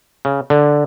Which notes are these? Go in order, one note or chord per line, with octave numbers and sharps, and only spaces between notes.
C#3
D3